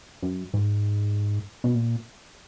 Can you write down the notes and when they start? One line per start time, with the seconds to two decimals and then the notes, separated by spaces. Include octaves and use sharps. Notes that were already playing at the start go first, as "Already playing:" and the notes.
0.22 F#2
0.54 G#2
1.64 B2
1.75 A#2